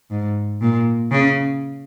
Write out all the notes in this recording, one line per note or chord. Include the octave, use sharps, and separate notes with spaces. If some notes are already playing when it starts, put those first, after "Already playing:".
G#2
A#2
C#3